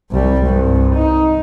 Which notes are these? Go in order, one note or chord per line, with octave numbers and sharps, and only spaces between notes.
C2 G3
C2 G2
D#4